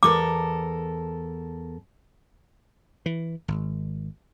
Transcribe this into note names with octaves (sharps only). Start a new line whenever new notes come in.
E2 A4 A#4 D6
E3
G#1